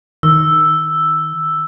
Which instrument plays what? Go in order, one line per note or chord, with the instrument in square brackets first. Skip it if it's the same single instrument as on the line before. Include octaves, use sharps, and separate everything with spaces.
[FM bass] D#3 [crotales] E6